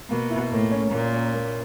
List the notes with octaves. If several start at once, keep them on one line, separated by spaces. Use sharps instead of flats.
B2 A#3
E4
A2 A#3
C#4
A#2 A#3
C#4
A#3